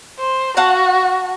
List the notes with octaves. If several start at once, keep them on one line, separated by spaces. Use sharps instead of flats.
C5
F#4 F5 F#5 A5